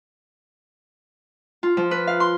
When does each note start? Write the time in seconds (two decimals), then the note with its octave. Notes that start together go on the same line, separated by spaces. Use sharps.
1.63 F4
1.77 F3
1.91 B4
2.07 F5
2.20 C6